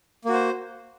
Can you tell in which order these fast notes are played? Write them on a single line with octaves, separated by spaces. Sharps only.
A#3 F#4 C5